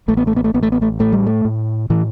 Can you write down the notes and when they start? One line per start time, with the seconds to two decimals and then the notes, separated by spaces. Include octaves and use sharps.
0.08 A1 A3
0.17 B3
0.27 A3
0.36 B3
0.44 A3
0.54 A1 B3
0.63 A3
0.72 B3
0.82 A3
0.99 A2 A3
1.12 G3
1.27 A3
1.45 A2
1.90 A2 E3